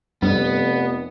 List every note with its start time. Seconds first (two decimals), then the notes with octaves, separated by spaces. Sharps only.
0.22 F1 G2 B3